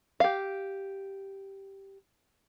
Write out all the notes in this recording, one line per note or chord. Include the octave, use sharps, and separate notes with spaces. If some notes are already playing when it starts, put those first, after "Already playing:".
G4 F5